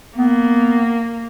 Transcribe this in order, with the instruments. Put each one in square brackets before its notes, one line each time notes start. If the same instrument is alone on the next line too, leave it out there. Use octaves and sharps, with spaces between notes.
[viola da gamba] A#3 [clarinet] B3